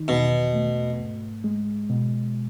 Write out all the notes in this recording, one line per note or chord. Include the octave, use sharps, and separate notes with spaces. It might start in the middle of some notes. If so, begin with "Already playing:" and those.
Already playing: D#3 D#4
E2 B2
A3
G#2
G#3
B2